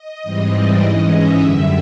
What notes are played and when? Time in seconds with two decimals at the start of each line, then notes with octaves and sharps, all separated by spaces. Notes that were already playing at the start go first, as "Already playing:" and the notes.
Already playing: D#5
0.23 G#2 E3 G3 C4
0.52 D5
0.82 G#2 E3 G#3 C#4 D#5
1.10 E5
1.40 F#2 D3 G3 E5